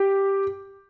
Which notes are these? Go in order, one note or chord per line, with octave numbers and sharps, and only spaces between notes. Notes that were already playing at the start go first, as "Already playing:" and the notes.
Already playing: G4